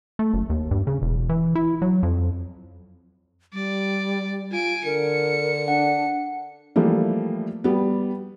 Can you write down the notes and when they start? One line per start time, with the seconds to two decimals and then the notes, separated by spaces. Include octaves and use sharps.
0.19 A3
0.34 F#1
0.50 D#2
0.71 G2
0.87 C#3
1.02 E1
1.29 E3
1.55 E4
1.82 F#3
2.03 F2
3.53 G3 D5
4.52 F4 G#5 D7
4.85 D3 A#4 C#7
5.68 D4 F#5
6.76 E3 F3 G3 A3 A#3
7.64 G3 B3